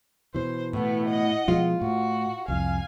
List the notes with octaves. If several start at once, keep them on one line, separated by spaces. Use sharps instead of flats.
B2 E3 C5
A2 A3 B3
D#5 F#5
B2 F3 G#3 F4
A2 F#4
C2 F2 F5 G#5